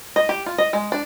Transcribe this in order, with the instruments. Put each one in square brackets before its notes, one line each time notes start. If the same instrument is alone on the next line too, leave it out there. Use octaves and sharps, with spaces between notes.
[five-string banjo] D#5
G4
F4
D#5
G#3
D4